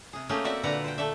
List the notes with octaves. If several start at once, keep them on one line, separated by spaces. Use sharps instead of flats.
C3 G#4
A3 A#3 C#4 D#4 G4 G#4
C4 F#4 G4 D5 E5 F#5
A#2 D3 B4 D5 F#5 A#5
C5 G5
A3 A4 D5 E5